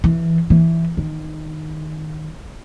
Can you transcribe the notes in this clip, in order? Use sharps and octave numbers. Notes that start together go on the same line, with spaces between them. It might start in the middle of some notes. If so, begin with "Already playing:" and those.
E3
E3
D#3